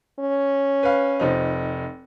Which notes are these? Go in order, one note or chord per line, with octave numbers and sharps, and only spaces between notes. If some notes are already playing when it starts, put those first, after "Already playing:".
C#4
B4 F5
F1 F3 D#4